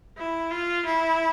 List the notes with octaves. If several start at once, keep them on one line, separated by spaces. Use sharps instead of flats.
E4
F4
E4